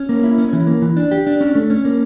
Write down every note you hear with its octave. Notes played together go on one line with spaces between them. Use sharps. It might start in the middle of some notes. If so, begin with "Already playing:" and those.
Already playing: C#4
A#3
E4
C#4
E3
A#3
E3
D4
G4
D4
C#4
A3
C#4
A#3